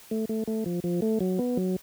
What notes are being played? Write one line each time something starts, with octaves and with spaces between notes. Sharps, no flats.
A3
A3
A3
F3
F3
A3
F#3
B3
F#3